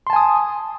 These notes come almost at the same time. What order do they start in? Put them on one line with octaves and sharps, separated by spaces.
C6 A5 G#5 D#6